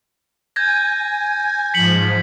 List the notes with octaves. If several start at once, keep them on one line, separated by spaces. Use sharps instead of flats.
G#5 G6 G#6 A#6
G#2 F3 B6 C#7 F#7